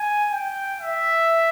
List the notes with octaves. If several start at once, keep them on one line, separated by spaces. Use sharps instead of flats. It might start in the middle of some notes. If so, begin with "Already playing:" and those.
Already playing: G#5
G5
E5